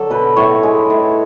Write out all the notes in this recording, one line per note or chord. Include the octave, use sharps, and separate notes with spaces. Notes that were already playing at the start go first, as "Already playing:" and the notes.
Already playing: D3 F#3 D4 A4
B2 B4
A2 C#5
G#3
A2